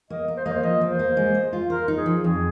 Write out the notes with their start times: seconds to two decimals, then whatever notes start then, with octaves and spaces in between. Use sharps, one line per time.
0.10 A#3 D#5
0.28 A#3
0.37 C5
0.45 A#3 D#5
0.52 C5
0.63 F3 D#5
0.81 A#3
0.90 C5
0.99 A#3
1.17 G#3
1.35 D#5
1.53 F4
1.70 A#4 C5
1.88 D#4
1.97 G#4
2.06 F3
2.24 F2 G#4